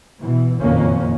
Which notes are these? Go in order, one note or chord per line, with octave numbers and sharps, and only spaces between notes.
B2 E3
F#1 F2 A#2 D#3 A#3 C#4